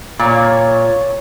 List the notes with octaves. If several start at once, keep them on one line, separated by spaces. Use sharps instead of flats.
A#2 C#5